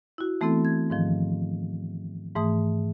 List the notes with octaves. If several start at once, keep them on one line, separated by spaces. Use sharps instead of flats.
E4 F#4
E3 A3 B3 C4 E4 A4
G#6
G#2 D#3 F3
G#2 E3 A3 D#6